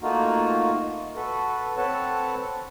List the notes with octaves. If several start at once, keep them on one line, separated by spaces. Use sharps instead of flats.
A3 A#3 D#4 F4 F#4
F#4 A4 B4
C4 A4 B4 C#5 F#5 A5